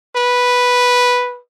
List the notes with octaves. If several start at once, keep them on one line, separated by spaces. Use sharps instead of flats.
B4